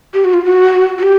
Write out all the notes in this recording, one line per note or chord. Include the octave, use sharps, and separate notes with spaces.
G4
F#4
F4
F#4
F#4
G4